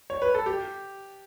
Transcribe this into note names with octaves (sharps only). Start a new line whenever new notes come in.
C#5
B4
A4
G4